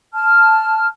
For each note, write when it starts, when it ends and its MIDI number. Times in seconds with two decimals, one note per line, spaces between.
0.14 0.87 81
0.14 0.87 89